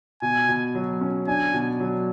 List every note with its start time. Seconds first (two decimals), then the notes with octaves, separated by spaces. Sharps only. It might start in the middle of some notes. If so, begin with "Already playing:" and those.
0.22 B2 G#5
0.49 B2
0.75 F#3
1.01 C#4
1.27 D4 G#5
1.54 B2
1.80 F#3